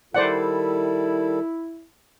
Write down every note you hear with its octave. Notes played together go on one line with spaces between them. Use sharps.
D#3 G3 E4 A4 C5 D5 F#5